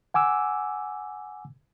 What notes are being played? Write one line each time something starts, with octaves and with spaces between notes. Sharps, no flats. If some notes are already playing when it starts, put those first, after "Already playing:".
F#5 G#5 D6 E6